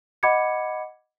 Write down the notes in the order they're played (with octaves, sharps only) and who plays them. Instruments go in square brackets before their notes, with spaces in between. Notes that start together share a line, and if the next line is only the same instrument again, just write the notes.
[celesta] D#5 F#5 B5 D6 G#6 C#7